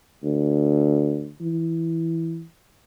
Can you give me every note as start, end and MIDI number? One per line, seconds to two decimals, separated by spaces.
0.23 1.31 38
1.41 2.44 52